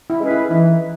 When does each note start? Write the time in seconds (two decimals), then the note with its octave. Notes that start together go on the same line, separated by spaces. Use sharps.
0.10 E4
0.20 G#3 C#4 G#4 B4
0.31 E4
0.50 E3 D#4